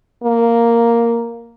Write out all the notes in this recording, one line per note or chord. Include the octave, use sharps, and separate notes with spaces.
A#3